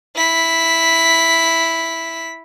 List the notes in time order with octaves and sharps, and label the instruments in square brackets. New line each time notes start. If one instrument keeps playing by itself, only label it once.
[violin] E4 B6